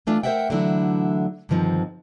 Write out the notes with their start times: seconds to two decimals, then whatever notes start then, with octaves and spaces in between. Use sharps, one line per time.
0.07 E3 A3 D4 F4
0.23 A#4 C5 D5 E5 F#5 G5
0.50 D3 E3 F#3 A3 D4 E4
1.49 G2 D3 D#3 F3 C4